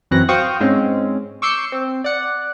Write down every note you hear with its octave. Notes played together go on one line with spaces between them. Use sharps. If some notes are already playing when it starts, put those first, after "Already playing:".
F#2 E3 F#3 C4 F#6 A#6
F#4 C5 F5 G5 C#6 D#6
G#2 G#3 C4 C#4
C#6 D6 E6 G6 C7 C#7
C4
D5 F#5